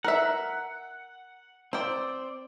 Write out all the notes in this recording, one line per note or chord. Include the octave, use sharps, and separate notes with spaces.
A#4 E5 F#5
C4 C5 D5 G5